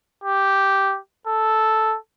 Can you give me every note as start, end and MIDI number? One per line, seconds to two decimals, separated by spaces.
0.24 0.99 67
1.27 1.97 69